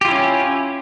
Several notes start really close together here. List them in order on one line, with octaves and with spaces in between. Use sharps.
G4 F4 E4 C#4